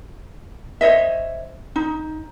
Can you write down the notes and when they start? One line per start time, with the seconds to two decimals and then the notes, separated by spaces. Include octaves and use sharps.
0.81 C5 C#5 D#5 E5
1.76 D#4